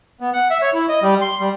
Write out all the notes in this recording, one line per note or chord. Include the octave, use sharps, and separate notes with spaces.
B3
F#5
E5
C#5
E4
D#5
G3
C6
G3